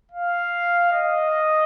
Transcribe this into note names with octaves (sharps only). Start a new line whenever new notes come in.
F5
D#5